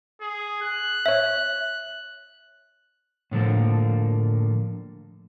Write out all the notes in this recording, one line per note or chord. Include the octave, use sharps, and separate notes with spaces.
G#4
F#6
C#5 E5
A2 D3 F3 A#3